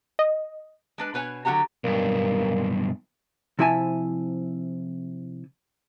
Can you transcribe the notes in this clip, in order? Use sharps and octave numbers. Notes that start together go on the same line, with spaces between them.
D#5
G#3 D4 B4
B2 B4 C#5 G#5
D3 F#3 F#4 G4 A#5
B1 G2 A#3
C3 F3 E4 E5 G#5 A5